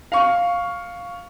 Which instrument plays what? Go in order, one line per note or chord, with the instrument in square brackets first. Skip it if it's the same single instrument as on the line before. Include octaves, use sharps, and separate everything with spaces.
[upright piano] F5 C#6